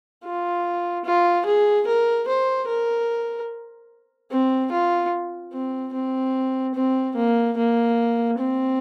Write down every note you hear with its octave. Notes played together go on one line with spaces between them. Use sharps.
F4
F4
G#4
A#4
C5
A#4
C4
F4
C4
C4
C4
A#3
A#3
C4